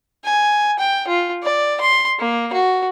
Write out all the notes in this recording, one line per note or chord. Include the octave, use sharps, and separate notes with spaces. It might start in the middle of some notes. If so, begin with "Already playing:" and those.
G#5
G5
F4
D5
C6
A#3
F#4